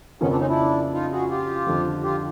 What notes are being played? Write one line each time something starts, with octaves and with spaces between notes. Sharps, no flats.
F2 C#3 F3 A#3 B3 C#4
C4 D4
C#4 D#4
D4 E4
D#4 F4
F#4 G#4
F4 G4
F2 D3 F3
F4 G4